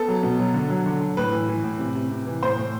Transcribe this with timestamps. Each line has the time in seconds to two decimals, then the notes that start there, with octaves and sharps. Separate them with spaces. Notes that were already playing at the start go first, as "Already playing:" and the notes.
Already playing: B3 A4
0.08 F#3
0.23 B2
0.39 F#3
0.54 D3
0.70 F#3
0.86 D3
1.01 D3
1.17 A2 B4
1.33 E3
1.49 E3
1.64 A2
1.79 C3
1.95 C3
2.10 C3
2.27 E3
2.42 A2 C5
2.58 A2